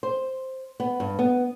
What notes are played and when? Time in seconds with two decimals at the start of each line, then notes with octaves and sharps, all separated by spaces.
0.03 C5
0.80 B3
1.00 G2
1.19 B3